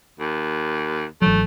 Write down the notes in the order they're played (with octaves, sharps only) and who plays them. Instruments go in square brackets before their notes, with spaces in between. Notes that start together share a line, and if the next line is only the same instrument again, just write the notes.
[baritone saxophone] D#2
[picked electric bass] G#1 E3 F#3 [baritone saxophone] A3